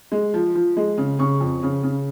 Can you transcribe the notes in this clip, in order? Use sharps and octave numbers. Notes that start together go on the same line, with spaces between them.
G#3
F3
F3
G#3
C#3
C#3 C#6
F2
C#3
C#3